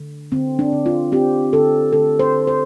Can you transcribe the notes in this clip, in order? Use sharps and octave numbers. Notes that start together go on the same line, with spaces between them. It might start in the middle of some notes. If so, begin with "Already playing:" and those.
Already playing: D3
D3 C4
D4
D3
F4
C4 G4
D3 A4
D3 A4
C5
D3
C5